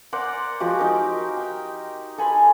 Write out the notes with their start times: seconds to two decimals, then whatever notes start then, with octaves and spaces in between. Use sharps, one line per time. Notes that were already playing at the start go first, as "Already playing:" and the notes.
0.12 A#4 C5 D5 F#5
0.60 F3 G#3 F#4 G4
0.79 D#4 A#4
1.37 G5
2.18 A4 G#5 B5 C6